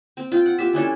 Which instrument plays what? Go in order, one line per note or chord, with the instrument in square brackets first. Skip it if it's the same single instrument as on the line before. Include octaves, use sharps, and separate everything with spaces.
[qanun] C4
F4 G5
F#5
F4 G4 E5
E3 C#4 D4 A4